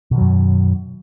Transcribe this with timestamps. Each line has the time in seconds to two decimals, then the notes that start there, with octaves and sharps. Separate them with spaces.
0.11 B2
0.14 D#3
0.18 F#3
0.21 F#2